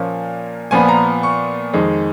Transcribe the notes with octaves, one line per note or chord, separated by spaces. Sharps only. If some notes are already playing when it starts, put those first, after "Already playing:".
Already playing: A#2 F3 A#3 C#4
A#2 F3 B3 G#5
A#5
C#6
F2 D#3 G#3